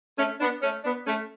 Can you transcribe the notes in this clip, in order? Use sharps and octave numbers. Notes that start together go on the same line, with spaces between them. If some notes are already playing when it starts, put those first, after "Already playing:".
A3 C#4
B3 D4
A3 C#4
B3 D4
A3 C#4